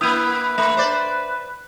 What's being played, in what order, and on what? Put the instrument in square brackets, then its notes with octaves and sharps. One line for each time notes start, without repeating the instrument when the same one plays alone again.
[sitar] A#3 E4 [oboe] B4 [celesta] D#6 G6 D#7
[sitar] A3 [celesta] E5 B5 C6
[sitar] C5 D5